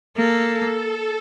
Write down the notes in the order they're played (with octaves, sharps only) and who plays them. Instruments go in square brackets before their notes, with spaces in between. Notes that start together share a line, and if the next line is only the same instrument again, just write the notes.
[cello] A#3 [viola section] A4